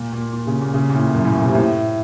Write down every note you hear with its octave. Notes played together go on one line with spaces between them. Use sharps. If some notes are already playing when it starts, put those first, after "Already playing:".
Already playing: A#2
A#2
A#2
C#3
A#2
C#3
A#2
A2
F#2
A2
A#2
C3
A2